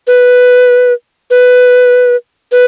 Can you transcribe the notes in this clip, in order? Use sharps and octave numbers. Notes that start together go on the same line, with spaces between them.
B4
B4
B4